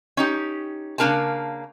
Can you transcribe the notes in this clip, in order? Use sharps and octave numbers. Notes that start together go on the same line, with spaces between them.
C#4 D#4 G4
C#3 A#3 D4 A#4 G#5 A5